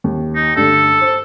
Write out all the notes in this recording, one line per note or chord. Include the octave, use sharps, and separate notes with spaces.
D#2
D#4
G2 D3 A3 A4
C5